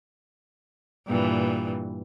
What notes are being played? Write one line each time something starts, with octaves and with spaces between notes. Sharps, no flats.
G2 A#2 E3